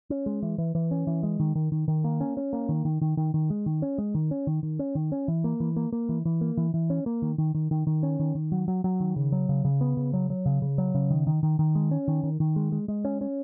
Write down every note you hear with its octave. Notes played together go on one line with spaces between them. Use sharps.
C#4
G#3
E3
E3
E3
C#4
E3
G#3
D#3
D#3
D#3
D#3
A#3
C#4
C#4
A#3
D#3
D#3
D#3
D#3
D#3
G#3
D#3
C#4
G#3
D#3
C#4
D#3
D#3
C#4
D#3
C#4
E3
A#3
E3
A#3
A#3
E3
E3
A#3
E3
E3
C#4
A#3
D#3
D#3
D#3
D#3
D#3
C#4
D#3
D#3
F#3
F#3
F#3
D#3
C#3
F#3
C#3
C#3
B3
C#3
F#3
F#3
C#3
C#3
F#3
C#3
D#3
D#3
D#3
D#3
G#3
C#4
D#3
D#3
D#3
G#3
G#3
G#3
C#4
C#4